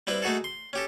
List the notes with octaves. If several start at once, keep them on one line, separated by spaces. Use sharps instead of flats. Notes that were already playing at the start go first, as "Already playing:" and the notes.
G3 C4 E4 B4
A3 D#4 F#4 G#4 A4
C6
C#4 G4 A4